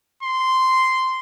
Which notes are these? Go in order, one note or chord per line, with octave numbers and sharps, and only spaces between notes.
C6